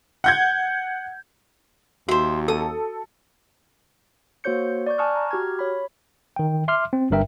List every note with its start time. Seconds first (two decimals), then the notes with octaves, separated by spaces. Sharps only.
0.24 F#5 G6 G#6
2.08 D#2 F#4 C5 E5
2.48 A4 D#6
4.44 A#3 F#4 C5 C#5 G6 C#7
4.87 D5 C#6 G6
4.98 G#5 A5 C#6 D#6 F6 F#6
5.16 A#5
5.31 F#4 G4 F6 G#6
5.59 C#5 B5
6.36 D#3 G5
6.68 E5 C6 D6 F6
6.93 C4
7.10 G1 G2 A#4 E5 G5